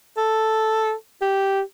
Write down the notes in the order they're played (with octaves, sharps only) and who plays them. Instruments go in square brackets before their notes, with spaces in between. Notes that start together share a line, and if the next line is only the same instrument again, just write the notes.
[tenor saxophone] A4
G4